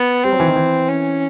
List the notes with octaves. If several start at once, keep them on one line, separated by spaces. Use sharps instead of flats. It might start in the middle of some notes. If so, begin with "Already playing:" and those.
Already playing: B3
G3 C4
F#3
E3
D#3
E3
C#4